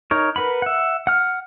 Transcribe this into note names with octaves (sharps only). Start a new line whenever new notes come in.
D#4 A#4 C#5
A#4 B4 F#5 B5
E5 F#5
F#5 F6